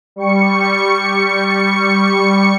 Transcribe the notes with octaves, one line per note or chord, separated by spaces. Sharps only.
G3 C#6 C#7